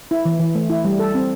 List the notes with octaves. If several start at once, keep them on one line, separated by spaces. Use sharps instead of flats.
E4
E3
E3
A3
E4
G3
A4
C4